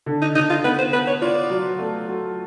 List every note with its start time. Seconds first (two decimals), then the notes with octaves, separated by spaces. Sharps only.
0.06 D3
0.22 D#4
0.35 D3 D#4
0.50 F4
0.64 B3 B4
0.79 C5
0.93 B3 B4
1.07 C#5
1.22 F4 D5
1.50 F#3
1.78 A3
2.08 F#3